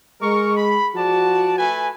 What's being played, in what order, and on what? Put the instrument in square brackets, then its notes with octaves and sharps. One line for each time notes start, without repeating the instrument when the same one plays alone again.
[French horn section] G#3 [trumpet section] A#4 C#6
[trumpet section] B5
[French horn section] F3 F#4 [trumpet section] D5 A5
[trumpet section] A3 B4 G#5